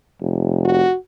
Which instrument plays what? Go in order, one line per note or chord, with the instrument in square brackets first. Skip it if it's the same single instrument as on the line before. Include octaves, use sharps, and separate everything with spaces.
[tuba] F1
[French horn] F#4